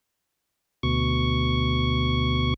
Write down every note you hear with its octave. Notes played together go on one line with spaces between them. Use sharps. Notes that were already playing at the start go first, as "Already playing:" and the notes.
D2 B2 C#6